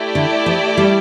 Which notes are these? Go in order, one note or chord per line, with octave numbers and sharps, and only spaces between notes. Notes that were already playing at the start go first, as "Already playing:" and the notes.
Already playing: A3 E4 G4 D5
D3
F3
G3